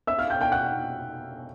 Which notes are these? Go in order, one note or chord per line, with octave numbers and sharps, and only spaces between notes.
E5 E6
F5 F6
G5 G6
G5 G6
F#5 F#6